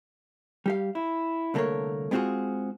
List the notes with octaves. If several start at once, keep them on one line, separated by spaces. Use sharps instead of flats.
G3 G4 F5
E4
C2 D3 A3 A#3 A#4 C#5
G#3 B3 C4 F4 F#4 G#4